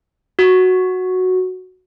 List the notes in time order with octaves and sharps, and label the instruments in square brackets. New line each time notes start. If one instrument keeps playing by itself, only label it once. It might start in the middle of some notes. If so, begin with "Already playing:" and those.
[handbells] F#4